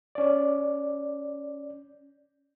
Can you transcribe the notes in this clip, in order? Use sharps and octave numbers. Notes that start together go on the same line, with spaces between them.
C#4 D5